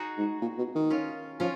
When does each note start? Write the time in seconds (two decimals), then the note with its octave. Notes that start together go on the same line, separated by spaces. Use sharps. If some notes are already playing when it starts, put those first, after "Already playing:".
Already playing: D#4 F#4 G#4
0.18 G#2
0.42 A#2
0.58 B2
0.75 D#3
0.90 C#4 F4
1.40 F3 C#4 F4